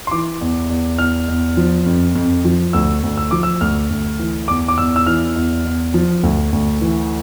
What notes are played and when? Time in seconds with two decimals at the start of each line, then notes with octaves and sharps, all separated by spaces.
0.07 C6
0.11 E3 D6
0.41 E2
0.70 E2
0.98 E2 F6
1.28 E2
1.57 F3
1.86 F2
2.15 F2
2.45 F3
2.73 D2 E6
3.03 D2
3.18 E6
3.31 F3 D6
3.43 E6
3.61 D2 F6
3.90 D2
4.19 E3
4.48 E2 D6
4.68 D6
4.78 E2 E6
4.96 E6
5.06 E3 F6
5.36 E2
5.65 E2
5.94 F3
6.23 D2
6.53 D2
6.81 E3